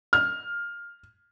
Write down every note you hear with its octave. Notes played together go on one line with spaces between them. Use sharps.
F6